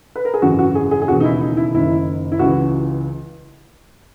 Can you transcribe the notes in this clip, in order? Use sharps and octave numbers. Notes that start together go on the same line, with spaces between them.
B4
A#4
G#4
G#1 F#2 C#3 E3 F#4
F#4
G#4
G#4
G#4
E1 D#2 C#3 E3 F#4
D#4
E4
D#4
E4
F#1 F#2 D#3 E4
E4
C#2 C#3 E3 F#4